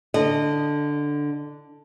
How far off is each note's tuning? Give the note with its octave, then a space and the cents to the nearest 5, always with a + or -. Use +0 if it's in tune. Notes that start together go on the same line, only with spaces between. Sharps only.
D3 +0 D#5 -20